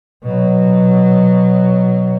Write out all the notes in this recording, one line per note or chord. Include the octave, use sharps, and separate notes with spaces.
B2 F#3